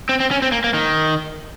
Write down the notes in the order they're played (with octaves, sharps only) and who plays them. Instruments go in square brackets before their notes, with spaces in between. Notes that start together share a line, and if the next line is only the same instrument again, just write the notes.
[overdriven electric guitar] C4
C4
C#4
C4
A#3
A#3
D#3